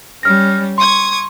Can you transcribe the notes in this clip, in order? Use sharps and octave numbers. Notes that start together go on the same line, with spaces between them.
G3 C#4 F6 A#6
C6 C#6 D#6 G#6